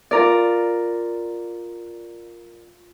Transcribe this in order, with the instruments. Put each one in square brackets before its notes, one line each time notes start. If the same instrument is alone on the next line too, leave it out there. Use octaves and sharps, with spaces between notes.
[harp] F4 A#4 D5